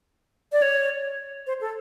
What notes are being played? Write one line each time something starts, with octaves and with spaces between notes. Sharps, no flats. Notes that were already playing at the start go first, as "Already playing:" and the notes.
D5
C#5
C5
A4